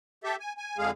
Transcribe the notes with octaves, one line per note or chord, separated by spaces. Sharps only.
G4 A4 E5
G#5
G#5
F2 D3 G#3 G#4 F5